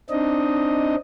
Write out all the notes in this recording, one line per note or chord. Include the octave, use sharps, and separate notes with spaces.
C4 D4 D#4 D#5